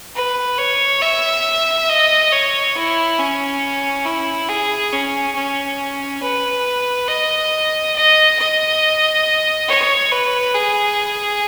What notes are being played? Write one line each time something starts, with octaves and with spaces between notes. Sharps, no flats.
B4
C#5
E5
D#5
C#5
E4
C#4
E4
G#4
C#4
C#4
B4
D#5
D#5
D#5
C#5
B4
G#4